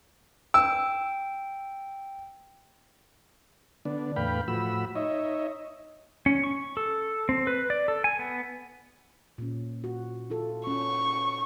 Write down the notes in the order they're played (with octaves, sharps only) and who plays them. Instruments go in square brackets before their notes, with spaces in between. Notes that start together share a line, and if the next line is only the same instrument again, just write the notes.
[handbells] G5 [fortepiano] E6
[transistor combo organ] D3 B3 D4
E2 A2 B4 F5 G5 B5
A2 F3 F#4 B5 E6
D#4 C#5 D#5 E5
[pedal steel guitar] C#4
C#6
A4
C4
B4
D5
A4
G#5
B3
[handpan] A#2 C#4
F#4
E4 F4 A4
[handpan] C#4 [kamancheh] C#6